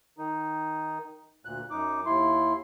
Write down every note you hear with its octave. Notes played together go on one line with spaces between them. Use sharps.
D#3 D#4
D2 A#2 F#6
F#2 D#4 D6
D#2 E4 C6